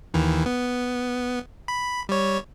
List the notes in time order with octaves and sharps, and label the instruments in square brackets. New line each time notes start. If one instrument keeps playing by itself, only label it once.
[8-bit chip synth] D#2 D#3 E3
B3
B5
G3 C#5